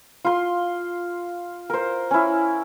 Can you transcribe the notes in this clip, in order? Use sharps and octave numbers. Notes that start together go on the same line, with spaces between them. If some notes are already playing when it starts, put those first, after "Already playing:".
F4 C6
A#4 C5
C#4 E4